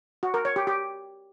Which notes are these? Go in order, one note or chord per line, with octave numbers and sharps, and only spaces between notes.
F#4
A#4
C#5
G4
G4